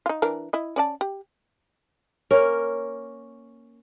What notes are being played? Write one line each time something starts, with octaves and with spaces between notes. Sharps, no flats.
D#4 F4
E3 D4 A#4
E4 D#5
C#4 D5 A5
G4
A#3 C#4 A#4